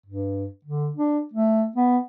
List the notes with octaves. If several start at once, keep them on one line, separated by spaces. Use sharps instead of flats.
G2
D3
D4
A3
B3